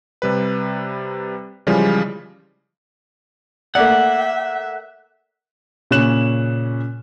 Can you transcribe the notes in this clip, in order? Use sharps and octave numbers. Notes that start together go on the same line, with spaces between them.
C3 G3 B4
C#3 E3 F3 G3 G#3
A3 A#3 D5 E5 F#5
A#2 C#3 C#4 F#6 E7 F#7